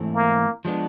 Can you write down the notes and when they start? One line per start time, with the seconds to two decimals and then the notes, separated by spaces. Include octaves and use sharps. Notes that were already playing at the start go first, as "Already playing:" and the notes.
Already playing: G#2 E3 A3 C4 E4
0.15 A#3
0.65 F3 G#3 B3 D4